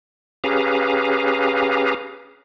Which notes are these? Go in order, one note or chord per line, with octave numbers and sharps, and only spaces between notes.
C#4 G4 G#4 B4 F5 A#5